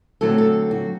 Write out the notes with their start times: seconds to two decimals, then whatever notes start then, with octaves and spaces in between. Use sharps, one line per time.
0.21 D3 F#3 A3 C4 A4
0.38 A4
0.71 F#4